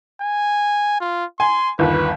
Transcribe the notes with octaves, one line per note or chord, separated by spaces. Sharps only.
G#5
F4
G#5 C6
G1 D#2 B4